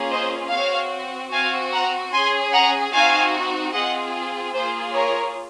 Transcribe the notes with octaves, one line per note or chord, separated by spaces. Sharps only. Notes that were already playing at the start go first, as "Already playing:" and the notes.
Already playing: A#3 C#4 F4 G#4
C5 D#5
C4 F#4 C#5 F5
C4 F#4 F5 G#5
F#5 A#5
C#4 G#4 G#5 C6
F#5 A#5
C4 D#4 F#4 F5 G#5
C4 F4 G#4 D#5 F#5
A#3 F4 G#4 C5
A#4 C#5